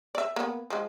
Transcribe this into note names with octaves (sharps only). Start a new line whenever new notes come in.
D5 E5
A#3 B3
F3 G#3